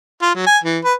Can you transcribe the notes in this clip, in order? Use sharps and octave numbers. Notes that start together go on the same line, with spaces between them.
F4
F#3
G#5
E3
B4